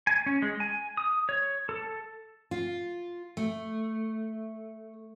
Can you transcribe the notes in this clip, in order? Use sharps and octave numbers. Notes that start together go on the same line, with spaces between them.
G#5
C#4
G#3
G#5
D#6
C#5
A4
F4
A3